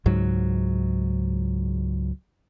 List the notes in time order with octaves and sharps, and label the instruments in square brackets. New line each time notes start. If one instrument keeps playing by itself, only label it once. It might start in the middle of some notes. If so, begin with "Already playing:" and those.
[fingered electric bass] C#2 G#2 F#3